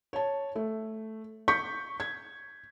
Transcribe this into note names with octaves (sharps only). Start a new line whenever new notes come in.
C#5 A5
A3
C#6 G6 B6 C#7
G#6